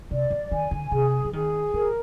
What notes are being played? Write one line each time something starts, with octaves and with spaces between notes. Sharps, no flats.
C3 D5
F3
D#3 G#5
D3
C3 G#4
F3
D#3 G#4
D#3 A#4